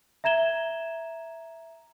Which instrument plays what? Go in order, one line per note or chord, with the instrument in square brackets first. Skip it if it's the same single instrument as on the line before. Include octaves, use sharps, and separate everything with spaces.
[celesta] E5 A#5 G#6 E7 G7